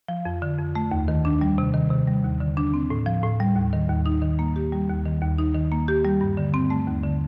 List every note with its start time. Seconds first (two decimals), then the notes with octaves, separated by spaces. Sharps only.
0.08 F3
0.25 F2
0.42 D3
0.59 F2
0.75 A3
0.91 D#2
1.08 D#3
1.25 D4
1.41 G3
1.58 C3
1.74 D#3
1.90 C3
2.07 G3
2.24 D#2
2.40 D3
2.57 D4
2.74 C4
2.90 A2
3.06 F3
3.23 A2
3.40 G3
3.56 D#2
3.73 D#3
3.89 D#2
4.06 D#4
4.22 D#3
4.39 A#3
4.56 G4
4.72 G3
4.89 D#2
5.05 D#3
5.21 D#2
5.38 D#4
5.55 D#3
5.72 A#3
5.88 G4
6.05 G3
6.21 G2
6.37 D3
6.54 C4
6.70 A3
6.87 D#2
7.04 D3